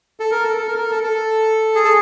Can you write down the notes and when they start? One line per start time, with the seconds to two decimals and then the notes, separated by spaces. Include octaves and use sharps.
0.20 A4
0.31 A#4
0.44 A4
0.58 A4
0.68 A#4
0.78 A#4
0.91 A4
1.03 A4
1.75 G#4
1.85 A4